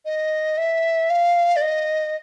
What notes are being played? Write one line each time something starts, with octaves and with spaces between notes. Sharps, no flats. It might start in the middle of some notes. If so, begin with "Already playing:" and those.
D#5
E5
F5
D5
D#5